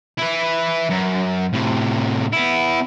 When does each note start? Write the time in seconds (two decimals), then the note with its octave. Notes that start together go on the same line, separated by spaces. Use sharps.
0.18 E4 B4
0.90 F#2
1.53 A2 C3
2.33 B3 E4